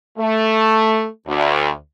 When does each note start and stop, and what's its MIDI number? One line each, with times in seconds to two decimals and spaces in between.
0.18 1.06 57
1.27 1.70 38